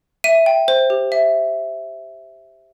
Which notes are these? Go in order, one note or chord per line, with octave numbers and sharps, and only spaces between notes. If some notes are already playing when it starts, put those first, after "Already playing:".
E5 D#7
G5
C5
G4
E5